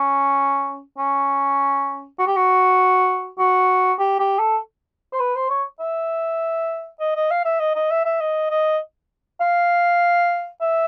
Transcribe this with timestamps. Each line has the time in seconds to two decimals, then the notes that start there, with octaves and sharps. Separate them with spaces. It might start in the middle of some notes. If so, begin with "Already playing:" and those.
Already playing: C#4
0.98 C#4
2.19 F#4
2.27 G4
2.36 F#4
3.39 F#4
3.99 G4
4.20 G4
4.39 A4
5.12 C5
5.19 B4
5.35 C5
5.50 C#5
5.80 E5
7.00 D#5
7.15 D#5
7.31 F5
7.45 E5
7.60 D#5
7.75 D#5
7.91 E5
8.05 E5
8.20 D#5
8.51 D#5
9.41 F5
10.61 E5